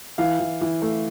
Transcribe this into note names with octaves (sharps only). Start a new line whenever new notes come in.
E3 F5
E3
E3
A3